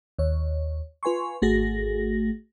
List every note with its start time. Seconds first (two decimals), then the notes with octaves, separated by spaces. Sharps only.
0.19 D#2 C#5
1.03 F4 B4 G#5 C6 C#6
1.42 G#1 A3 F#4 G#4 A#6